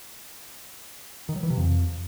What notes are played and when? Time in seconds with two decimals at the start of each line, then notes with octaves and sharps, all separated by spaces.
1.29 D#3
1.36 F#3
1.43 E3
1.50 C3
1.57 F2